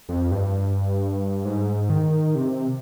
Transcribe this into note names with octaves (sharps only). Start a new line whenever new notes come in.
F2
G2
G#2
D#3
C3